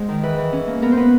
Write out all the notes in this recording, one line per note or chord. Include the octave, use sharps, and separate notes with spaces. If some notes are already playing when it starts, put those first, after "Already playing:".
Already playing: G#3 C5 F#5
D#3
E3 B4
E3
C#4
A#3
B3 A#4
C5
B3 B4